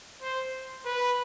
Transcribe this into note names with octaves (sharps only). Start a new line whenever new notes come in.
C5
B4